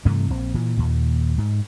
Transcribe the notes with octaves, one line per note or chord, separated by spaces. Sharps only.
G2 C3 E3 A3
A#1 C4
A#2 E3
D#2 A#2
G#2